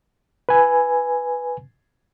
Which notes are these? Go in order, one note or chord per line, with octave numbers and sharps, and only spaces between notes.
B4 G#5